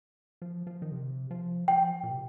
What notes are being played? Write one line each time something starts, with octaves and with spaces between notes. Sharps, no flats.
F3
F3
D#3
C3
F3
F3 G5
A#2
C3